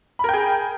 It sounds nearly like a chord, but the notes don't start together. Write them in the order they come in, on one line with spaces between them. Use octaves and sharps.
B5 A#4 G5 G#4